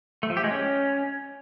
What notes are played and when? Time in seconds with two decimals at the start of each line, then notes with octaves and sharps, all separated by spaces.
0.23 A3
0.30 F3
0.37 G4
0.44 G#3
0.51 C#4